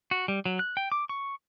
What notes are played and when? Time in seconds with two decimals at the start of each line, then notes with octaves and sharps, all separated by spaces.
0.11 F#4
0.28 G3
0.46 F#3
0.59 F#6
0.77 G5
0.92 D6
1.09 C#6